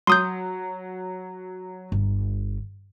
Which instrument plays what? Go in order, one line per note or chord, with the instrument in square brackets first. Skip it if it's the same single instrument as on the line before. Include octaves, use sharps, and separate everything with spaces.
[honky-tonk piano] F#3 [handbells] C6 D#6 G6
[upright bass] G1